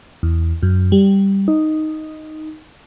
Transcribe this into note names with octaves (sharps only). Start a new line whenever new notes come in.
E2
F#2
G3
D#4